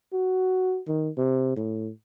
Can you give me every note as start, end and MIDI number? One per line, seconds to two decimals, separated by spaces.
0.13 0.80 66
0.88 1.10 51
1.18 1.53 48
1.57 1.91 45